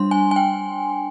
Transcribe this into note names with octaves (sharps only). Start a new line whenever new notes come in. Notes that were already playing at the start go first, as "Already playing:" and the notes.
Already playing: G3 D4 C6
G#5
G#5
G5